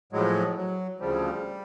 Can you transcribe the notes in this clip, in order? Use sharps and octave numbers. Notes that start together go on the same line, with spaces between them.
A2 F3 F#3 G#3
F#3
D2 C#3 F3 G3